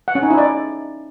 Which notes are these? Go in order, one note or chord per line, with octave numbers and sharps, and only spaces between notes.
F#5
C#4
D#4
E4
D5